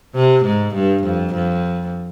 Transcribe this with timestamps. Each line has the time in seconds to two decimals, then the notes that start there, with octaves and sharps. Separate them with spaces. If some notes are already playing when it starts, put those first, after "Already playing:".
0.16 C3
0.45 G#2
0.75 G2
1.04 F2
1.34 F2